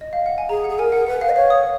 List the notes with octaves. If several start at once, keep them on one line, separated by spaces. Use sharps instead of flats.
D#5
F5
F#5
G#5
G#4 A#5
F#5
G#4
A#4 G#5
F#5
B4 F#5
F5
D#5
C#5 F5
D#6